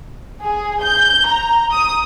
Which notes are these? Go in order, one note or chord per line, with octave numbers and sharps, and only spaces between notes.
G#4
G6
A#5
D#6